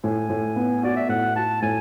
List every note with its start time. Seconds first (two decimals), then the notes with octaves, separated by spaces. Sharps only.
0.04 A2 G#5
0.30 A2
0.56 B3
0.83 F#4 D5
0.96 E5
1.09 A2 F#5
1.36 F#4 A5
1.62 A2 G#5